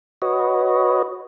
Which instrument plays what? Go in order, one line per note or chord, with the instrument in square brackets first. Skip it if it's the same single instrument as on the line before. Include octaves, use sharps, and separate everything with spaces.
[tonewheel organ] F#4 B4 C#5 D#5